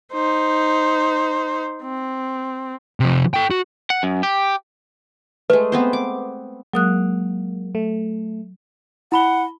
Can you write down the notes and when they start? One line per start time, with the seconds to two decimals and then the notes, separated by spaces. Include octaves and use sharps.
0.13 D#4 C5
1.83 C4
3.00 C3 F3
3.34 A4 G5
3.51 F#4
3.90 F#5
4.03 F#2
4.23 G4
5.50 G#3 A3 B4
5.72 B3 C4 C5
5.93 D6
6.74 F#3 G#3 A#3 D#6 F#6
7.75 A3
9.12 E4 F#5 B5 G7